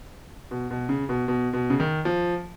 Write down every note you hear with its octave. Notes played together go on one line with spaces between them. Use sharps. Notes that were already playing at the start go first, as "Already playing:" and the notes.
B2
B2
C#3
B2
B2
B2
C#3
D#3
F3